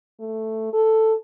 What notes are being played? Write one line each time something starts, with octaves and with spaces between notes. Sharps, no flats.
A3
A4